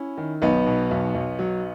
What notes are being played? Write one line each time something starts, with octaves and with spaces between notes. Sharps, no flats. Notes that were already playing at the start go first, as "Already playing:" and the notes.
Already playing: C#4 E4
D#3
B1 B3 D#4
B2
B1
B1
F#3